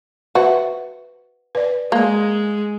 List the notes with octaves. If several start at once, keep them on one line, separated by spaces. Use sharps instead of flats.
F#4 B4 C5 E5
B4 D5
G#3 A#3